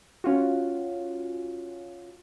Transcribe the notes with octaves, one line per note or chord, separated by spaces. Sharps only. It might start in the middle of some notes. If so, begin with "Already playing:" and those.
C#4 F4 F#4